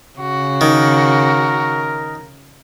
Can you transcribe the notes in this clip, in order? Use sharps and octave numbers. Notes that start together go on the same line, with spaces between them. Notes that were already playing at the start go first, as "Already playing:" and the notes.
C#3 F#4
D#3 A#4